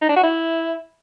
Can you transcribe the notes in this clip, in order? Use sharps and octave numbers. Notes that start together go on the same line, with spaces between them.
D#4
D4
F#4
E4